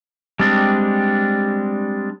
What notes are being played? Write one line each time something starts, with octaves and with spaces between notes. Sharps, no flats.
G3 G#3 C4 D4